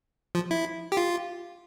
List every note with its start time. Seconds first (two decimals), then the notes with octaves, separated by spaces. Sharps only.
0.35 F3
0.51 E4
0.92 G4
0.97 F4